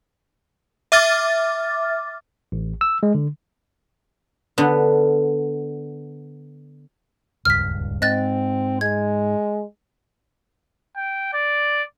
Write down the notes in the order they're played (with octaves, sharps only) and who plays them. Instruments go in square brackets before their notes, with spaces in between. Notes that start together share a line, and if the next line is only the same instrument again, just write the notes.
[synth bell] E5 D6 F6 A6
[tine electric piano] A1
E6
G#3
D3
[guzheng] D3 B3
[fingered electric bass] D#1 C#2 G2 [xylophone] F6 B6
[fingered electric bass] G#2 [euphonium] C4 [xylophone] D#5 F#6 A6
[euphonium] G#3 [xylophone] G#6
[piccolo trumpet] G5
D5